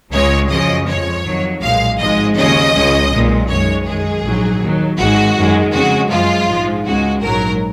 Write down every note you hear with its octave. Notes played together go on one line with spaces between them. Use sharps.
C#2 C#3 G#3 C#5
F#2 C#3 F3 D#5
F2 F3 G#3 C#5
F2 D#3 F#3
B1 A#2 G#3 F5
G#1 G#2 F3 G#3 D#5
D#2 C#3 F3 D#5
C#2 C#3 G#3
B1 A#2 G#3
F#2 D#3 G#3 C#5
F#2 D#3 G#3 G#4
A#1 G#2 F#3
D#2 D#3 F#3
G#1 G#2 D#3 G#3 F#4
F#2 D#3 G#3
F2 C#3 G#3 F#4
F#2 F3 G#3 F4
A#1 G#2 F3 G#3
C#2 C#3 G#3 F#4
A#1 G#2 F#3 A#4